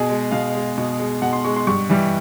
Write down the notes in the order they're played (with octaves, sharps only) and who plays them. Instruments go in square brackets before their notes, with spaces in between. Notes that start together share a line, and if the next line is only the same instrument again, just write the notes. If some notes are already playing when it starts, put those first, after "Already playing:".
Already playing: [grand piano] B2 G#4
G#3
B2 F5
G#3
B2
G#3
B2 F#5
C6
G#3 C#6
C6
G2 C#6
E3 G3